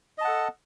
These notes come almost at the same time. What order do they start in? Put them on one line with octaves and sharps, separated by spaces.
D#5 A5 F#5 A4